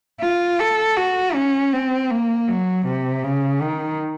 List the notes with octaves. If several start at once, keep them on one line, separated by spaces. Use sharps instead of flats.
F4
A4
F#4
C#4
C4
A#3
F#3
C3
C#3
D#3